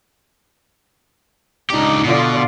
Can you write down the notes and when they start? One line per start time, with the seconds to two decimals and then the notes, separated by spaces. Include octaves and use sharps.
1.70 C#2 D4 D#4 G4
2.04 B2 D3 F4 D5